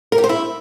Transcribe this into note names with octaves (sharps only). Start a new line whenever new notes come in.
A#4
G4
C5
E4